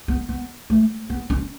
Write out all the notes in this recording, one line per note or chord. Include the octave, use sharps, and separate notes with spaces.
B3
B3
A3
B3
C#4